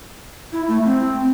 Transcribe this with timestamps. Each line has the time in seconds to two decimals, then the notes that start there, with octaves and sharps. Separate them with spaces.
0.53 E4
0.68 A3
0.85 C4